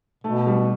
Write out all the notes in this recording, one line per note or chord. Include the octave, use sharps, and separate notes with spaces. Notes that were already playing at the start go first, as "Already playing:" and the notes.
B2 A3
G3